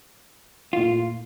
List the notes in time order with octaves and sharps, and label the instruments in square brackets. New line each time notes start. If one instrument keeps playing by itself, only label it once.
[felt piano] A#2 A3 E4 [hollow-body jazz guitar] F4